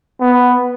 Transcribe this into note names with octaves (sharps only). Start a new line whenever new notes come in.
B3